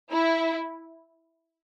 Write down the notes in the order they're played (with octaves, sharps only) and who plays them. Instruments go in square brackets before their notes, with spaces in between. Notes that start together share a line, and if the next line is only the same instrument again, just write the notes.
[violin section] E4